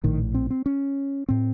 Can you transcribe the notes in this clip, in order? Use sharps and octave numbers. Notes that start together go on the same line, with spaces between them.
A#1 A2 D#3
C4
C4
C#4
A2 C4